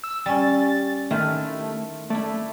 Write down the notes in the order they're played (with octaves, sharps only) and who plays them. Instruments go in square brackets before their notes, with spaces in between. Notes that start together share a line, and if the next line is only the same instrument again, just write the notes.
[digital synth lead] E6
[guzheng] G3 C#4 [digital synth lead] A6
[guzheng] D#3 E4 F4 [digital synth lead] A3
[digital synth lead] A3 [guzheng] E4 D5